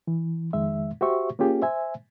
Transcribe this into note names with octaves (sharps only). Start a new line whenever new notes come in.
E3
F2 D#3 G#3 E5
F#4 G4 C5 E5 C#6
A#3 C#4 F4 G4 G#4
C5 E5 G#5